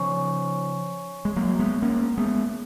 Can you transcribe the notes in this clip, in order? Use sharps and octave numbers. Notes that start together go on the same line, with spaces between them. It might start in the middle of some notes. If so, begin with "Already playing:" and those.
Already playing: C#3 F3 C#5 G#5 C#6
G#3
F#3 A#3
G#3 B3
A#3 C#4
G#3 B3